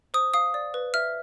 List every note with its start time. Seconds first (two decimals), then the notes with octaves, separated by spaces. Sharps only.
0.14 C5 D#6
0.34 F5 D#6
0.54 D5
0.74 B4
0.94 E5 F6